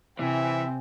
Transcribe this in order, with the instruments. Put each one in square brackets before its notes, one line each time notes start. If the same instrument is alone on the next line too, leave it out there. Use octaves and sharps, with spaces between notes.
[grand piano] C3 G#5 [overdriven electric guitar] E3 [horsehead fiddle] C4 [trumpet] E5